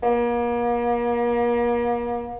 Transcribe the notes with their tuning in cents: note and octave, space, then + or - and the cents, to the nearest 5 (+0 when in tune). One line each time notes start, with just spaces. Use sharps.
A#3 +40